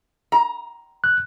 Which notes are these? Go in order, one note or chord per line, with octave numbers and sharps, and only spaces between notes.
A#5
F#6